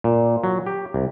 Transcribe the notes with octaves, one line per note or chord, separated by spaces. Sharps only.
A#2
F#3
G4
C2